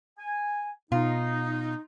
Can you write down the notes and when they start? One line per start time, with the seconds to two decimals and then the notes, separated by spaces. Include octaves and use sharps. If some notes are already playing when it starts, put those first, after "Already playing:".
0.17 G#5
0.92 B2 D#4 F4